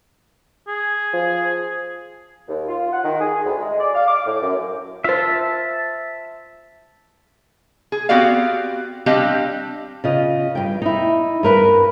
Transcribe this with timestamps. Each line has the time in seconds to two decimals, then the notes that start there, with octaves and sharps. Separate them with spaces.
0.68 G#4
1.13 F3
2.48 D#2
2.68 F4
2.92 F#5
3.04 D#3
3.20 G#4
3.45 D2
3.60 G#3
3.80 D5
3.95 F5
4.08 D6
4.26 A2
4.42 F#2
5.04 F4 C5 E5 A5
7.92 G#4
8.09 B3 C4 F#4 G4 D5 F5
9.06 G3 C4 D4 G4 D#5 F5
10.04 C#3 F4 D#5
10.55 G2 G5
10.82 D#4 E4
11.43 G2 A#4 B4